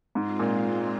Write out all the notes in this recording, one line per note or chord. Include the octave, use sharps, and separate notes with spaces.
G#2 G#3 C4 F4
A#2